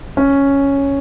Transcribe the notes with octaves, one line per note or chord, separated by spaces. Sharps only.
C#4